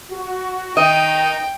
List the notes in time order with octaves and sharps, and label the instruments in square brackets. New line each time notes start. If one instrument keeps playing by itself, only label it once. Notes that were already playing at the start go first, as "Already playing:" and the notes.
[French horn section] F#4
[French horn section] D#3 [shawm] D#4 [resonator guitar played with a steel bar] D#5 [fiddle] G5